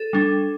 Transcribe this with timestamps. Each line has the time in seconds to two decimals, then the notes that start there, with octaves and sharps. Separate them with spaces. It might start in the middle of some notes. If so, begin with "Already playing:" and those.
Already playing: A4
0.13 G3 D4